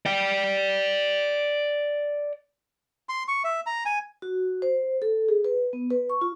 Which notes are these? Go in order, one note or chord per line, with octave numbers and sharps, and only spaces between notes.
D5 G5
C6
C#6
E5
A#5
G#5
F#4
C5
A4
G#4
B4
B3
B4
C#6
F4